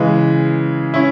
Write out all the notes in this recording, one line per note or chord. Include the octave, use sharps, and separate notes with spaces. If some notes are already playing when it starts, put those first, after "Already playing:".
Already playing: C#3 E3 G#3
C#4 E4